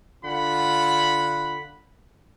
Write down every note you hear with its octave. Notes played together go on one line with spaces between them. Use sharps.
D3 F4 F#5 B5